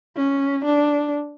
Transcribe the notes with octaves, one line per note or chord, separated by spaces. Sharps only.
C#4
D4